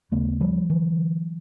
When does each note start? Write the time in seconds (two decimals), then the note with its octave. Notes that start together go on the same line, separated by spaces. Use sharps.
0.11 D#2 C#3 A3 B3
0.41 F3 G3
0.70 D3 E3 F#3